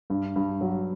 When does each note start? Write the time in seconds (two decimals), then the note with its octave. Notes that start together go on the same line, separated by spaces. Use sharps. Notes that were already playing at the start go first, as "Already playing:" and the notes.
0.10 G2
0.36 G2
0.61 F#3